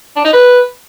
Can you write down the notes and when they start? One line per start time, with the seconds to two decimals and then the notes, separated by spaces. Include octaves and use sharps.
0.16 D4
0.25 D#4
0.33 B4